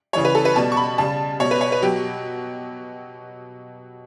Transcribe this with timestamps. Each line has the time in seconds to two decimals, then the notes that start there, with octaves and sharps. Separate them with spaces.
0.13 C#3 E3 G3 C#5
0.25 B4
0.35 A4
0.45 B4
0.56 B2 G3 A5
0.72 C#6
0.77 B5
0.98 C#3 G3 A5
1.40 B2 G3 C#5
1.51 B4
1.61 C#5
1.72 B4
1.82 B2 F#3 G4